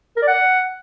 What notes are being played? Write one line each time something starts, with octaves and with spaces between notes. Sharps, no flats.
A#4
D5
F#5